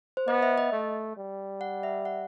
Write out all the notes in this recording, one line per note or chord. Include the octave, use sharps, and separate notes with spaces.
C5
B3 D#5
E5
D#5
A3
G3
F#5
E5
F#5